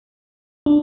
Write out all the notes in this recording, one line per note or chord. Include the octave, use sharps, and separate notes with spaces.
D4